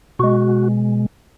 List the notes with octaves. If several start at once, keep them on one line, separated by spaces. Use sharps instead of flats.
B2 G#3 F#4